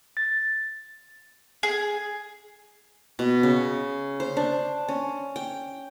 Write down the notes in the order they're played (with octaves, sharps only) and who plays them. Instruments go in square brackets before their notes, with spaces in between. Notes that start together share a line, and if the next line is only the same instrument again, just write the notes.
[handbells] A6
[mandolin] G#4
[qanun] B2
C#3
C5
D4
C#4
G5